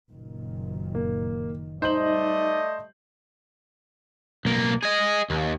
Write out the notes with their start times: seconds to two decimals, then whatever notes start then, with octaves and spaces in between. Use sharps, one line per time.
0.11 F#1 A#2 D#3
0.95 A#3
1.82 G3 A3 D#4 C5 D5 D#5 G6 F#7
4.45 B1 A#3
4.83 G#4 D#5
5.30 D#2